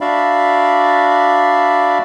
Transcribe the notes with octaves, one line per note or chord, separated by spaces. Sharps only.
D4 F#4 D5 E5 F5 B5